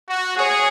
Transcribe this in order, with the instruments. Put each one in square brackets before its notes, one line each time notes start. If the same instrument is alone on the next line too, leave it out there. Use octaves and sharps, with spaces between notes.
[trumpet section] F#4
[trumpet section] G#4 [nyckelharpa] C#5